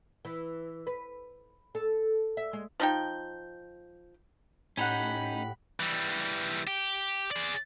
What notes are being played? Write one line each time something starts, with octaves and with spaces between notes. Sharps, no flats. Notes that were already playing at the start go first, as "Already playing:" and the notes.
E3
B4
A4
E5
G#3
F3 D#4 G5
A2 C#4 D#4 G4 F#5 B5
E3 G3
G4
G#4 D5